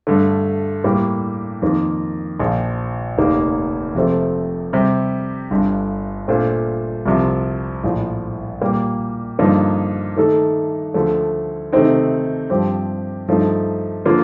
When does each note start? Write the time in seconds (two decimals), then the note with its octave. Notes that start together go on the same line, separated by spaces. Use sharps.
0.07 G2 D3 A3
0.84 A2 G3 A#3
1.62 F2 D#3 A#3
2.40 A#1 A#2 F3
3.18 F1 D#2 D#3 A#3 D#4
3.95 F2 C3 F3 A3 C4
4.73 C3 G3 C4
5.51 G1 G2 D3
6.28 A#2 A3 D4 F4 C5
7.06 C2 C3 F3
7.84 A#1 A2 F3
8.61 A#2 G3 A#3
9.39 G2 D3 F3 A#3 D#4
10.16 D#3 A3 D#4 A4
10.94 D2 D3 F3 A3
11.73 C3 D#3 A3 C4 D#4
12.50 G2 F3 C4 G4
13.28 G2 F3 A3 D#4
14.05 D3 F3 A#3 F4